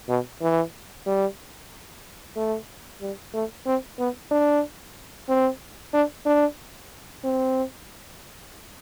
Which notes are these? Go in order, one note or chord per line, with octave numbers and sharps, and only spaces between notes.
B2
E3
G3
A3
G3
A3
C4
B3
D4
C4
D4
D4
C4